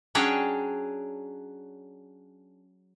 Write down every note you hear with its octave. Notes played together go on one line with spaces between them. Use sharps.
F#3 C#4 D4 G#4 C#5 G5